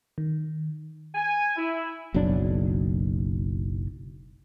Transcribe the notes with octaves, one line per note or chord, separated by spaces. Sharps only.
D#3
G#5
E4
F#1 B1 F#3 D4